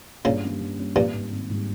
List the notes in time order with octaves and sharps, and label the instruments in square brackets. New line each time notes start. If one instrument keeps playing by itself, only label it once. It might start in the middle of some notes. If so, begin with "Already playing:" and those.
[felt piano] G2 [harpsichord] A#2 C#3
[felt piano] G3 A#3 C#4
G2
G3 A#3 C#4
[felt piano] G#1 [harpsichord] G2 A#2
[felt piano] G#2 G3 A#3
G#1
G#2 G3 A#3